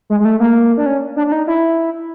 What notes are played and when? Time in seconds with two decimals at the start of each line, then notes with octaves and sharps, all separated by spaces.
0.10 G#3
0.20 G#3
0.25 A3
0.40 A#3
0.77 D4
0.86 C#4
1.16 D4
1.27 D4
1.32 D#4
1.47 E4